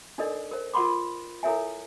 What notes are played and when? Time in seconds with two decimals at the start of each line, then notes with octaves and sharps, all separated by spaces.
0.18 D4 D#4 A4 A#4 D5 D#5
0.51 A#4 C5
0.74 F4 A#4 F#5 B5 C6 D6
1.43 E4 A4 A#4 C#5 E5 G#5